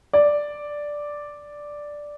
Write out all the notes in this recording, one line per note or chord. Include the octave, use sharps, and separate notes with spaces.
D5